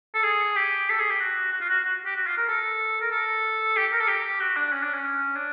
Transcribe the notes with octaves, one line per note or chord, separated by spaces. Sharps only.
A4
G#4
G4
A4
G#4
G4
F#4
F#4
F4
F#4
F#4
G4
F#4
F4
A#4
A4
A#4
A4
G4
A#4
A4
G4
F#4
D4
C#4
D4
C#4
D4